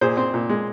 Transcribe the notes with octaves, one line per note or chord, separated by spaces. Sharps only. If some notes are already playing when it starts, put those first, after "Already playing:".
A#2 G#4 C5
C4
A#2
G#3